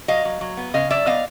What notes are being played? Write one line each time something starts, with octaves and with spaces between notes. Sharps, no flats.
F#3 D#5 F5
F#3
F#3
B3
C#3 D#5 F5
F#3 D5 E5
B3 D#5 F5